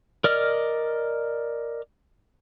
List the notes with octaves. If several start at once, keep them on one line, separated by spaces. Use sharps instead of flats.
A#4 D5 D#5 F6